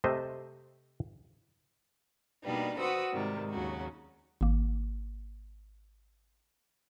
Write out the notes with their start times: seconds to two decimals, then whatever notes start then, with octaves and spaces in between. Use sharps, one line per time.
0.04 C3 A3 C5 D#5
2.44 B2 G3 A#3 D4 D#4 B4
2.79 F#4 B4 C5 F#5 D#6 E6
3.12 G#2 C3 D#3 G3
3.50 D#2 C#3 F#3 F#4
4.41 G#1 A#3